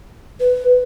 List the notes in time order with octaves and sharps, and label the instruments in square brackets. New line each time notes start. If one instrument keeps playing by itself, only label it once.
[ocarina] B4